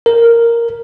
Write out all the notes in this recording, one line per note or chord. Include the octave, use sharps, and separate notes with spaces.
A#4